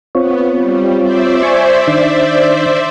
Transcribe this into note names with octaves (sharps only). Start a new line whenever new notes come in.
B3 C4 F4 C#5
G3
C5 D5 E5
G#5 C#6
D#3 D4